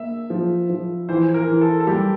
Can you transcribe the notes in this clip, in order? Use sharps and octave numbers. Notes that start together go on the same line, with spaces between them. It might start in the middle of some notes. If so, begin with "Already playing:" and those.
Already playing: A#3 E5
F3
F3
E3 C5
A#4
E3
A4
A4
G3 G4